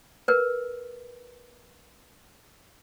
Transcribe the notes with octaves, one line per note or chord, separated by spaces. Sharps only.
A#4 B4